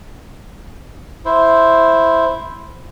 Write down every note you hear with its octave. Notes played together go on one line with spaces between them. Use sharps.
E4 C5